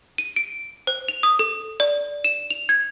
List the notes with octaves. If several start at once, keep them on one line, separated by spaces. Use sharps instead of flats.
D#7
D7
C5
F7
D#6
A4
D5
E7
F7
G#6